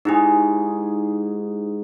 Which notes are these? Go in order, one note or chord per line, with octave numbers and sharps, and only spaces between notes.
G#2 D#4 E4 G4 G#4